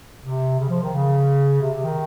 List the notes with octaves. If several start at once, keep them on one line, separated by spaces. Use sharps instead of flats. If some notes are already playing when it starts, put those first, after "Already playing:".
C3
C#3
F3
D#3
C#3
C3
C3
D#3